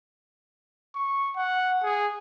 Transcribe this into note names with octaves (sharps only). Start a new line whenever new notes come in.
C#6
F#5
G#4